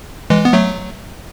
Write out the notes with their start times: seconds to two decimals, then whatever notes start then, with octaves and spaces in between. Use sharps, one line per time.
0.30 E3 G#3
0.45 B3
0.53 F#3 A3